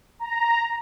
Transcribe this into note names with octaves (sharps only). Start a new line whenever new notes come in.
A#5